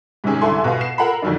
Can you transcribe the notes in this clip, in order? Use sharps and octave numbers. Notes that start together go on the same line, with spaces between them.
G#2 C3 D#3 C#4 G#4
C2 D3 E4 A4 G#5 C6
B2 B4 F5
C7 E7
A4 A#4 F#5 A#5 B5
F2 D3 D#3 F#3 D4